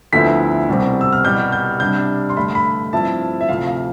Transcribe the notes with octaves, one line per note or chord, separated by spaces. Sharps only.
D2 D3 F3 B3 E4 B6
C2 B2 G3 C4
E6
F6
C2 B2 G3 G6
G6
C3 G3 D4 G6
C6
G2 D3 A3 B5
B5
G2 F3 C4 E4 A5
E5
D2 C3 F3 F5
F5